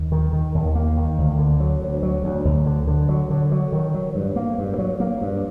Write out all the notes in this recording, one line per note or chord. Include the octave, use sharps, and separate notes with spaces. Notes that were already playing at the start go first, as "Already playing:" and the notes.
Already playing: D#2
D#3
D#3
D#2
A#3
D#3
D2
D3
F#3
D2
F#3
D2
D2
D3
D3
F#3
D3
F#3
D#3
F#3
G2
A#3
G2
F#3
A#3
G2